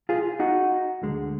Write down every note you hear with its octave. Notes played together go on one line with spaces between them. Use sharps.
F4 G#4
D#4 F#4
D2 D3 G#3